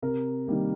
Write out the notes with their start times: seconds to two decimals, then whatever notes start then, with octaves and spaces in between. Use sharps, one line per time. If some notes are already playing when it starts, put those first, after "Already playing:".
0.02 C3 A#4
0.48 D#3 G3 A#3